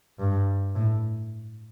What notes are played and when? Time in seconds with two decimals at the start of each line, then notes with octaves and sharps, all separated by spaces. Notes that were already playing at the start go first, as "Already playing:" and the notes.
0.19 G2
0.76 A2